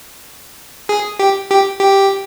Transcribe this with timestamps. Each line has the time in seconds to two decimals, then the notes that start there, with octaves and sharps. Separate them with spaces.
0.89 G#4
1.19 G4
1.50 G4
1.80 G4